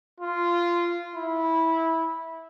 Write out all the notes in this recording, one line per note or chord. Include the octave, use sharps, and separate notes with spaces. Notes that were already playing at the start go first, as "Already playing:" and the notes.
F4
E4